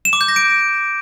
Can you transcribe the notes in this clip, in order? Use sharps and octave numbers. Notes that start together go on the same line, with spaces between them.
E7
D6
G6
A#6
D7